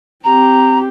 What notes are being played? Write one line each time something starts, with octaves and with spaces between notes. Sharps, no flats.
C4 G4 A#5